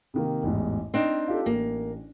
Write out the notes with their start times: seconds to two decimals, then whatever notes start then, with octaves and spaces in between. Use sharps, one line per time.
0.14 C3 D#3 A#3
0.43 A1 E2 G#2
0.94 C4 D4 D#4 G5
1.28 F4 G4 A4
1.46 A1 A#3